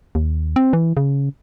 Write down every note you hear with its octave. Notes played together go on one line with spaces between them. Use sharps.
D#2
C4
E3
C#3